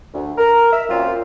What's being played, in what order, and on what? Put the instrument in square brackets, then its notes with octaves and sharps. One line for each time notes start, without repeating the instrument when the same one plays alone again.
[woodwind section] D2
A#4
E5
F#2 A#2 C4 F4